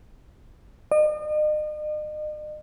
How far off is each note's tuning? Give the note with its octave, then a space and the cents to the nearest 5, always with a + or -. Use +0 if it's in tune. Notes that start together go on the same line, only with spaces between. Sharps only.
D#5 -40